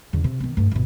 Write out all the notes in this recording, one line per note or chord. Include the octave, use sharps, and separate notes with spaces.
E2 C#3
C3
D#3 B3
G2 A3
G1 B2